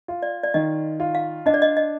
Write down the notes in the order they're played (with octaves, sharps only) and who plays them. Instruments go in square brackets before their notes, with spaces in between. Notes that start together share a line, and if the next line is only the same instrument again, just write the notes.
[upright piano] F4
[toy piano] D5
D5
[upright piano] D#3 [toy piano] D#5
[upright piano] F4
[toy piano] F5
[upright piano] D4 [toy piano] D#5
[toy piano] D5
D#5
D#5